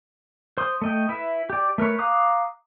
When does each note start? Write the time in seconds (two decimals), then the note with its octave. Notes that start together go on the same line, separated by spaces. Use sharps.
0.58 C5 C6 D#6
0.82 A3 D#5 G5
1.09 E4 B4 E5
1.50 G4 D5
1.78 A3 A#4 B4 C#5
1.99 F5 A#5 D6 D#6 F#6